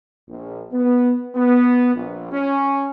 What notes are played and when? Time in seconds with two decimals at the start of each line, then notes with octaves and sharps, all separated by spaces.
0.28 A#1
0.72 B3
1.35 B3
1.95 A#1
2.31 C#4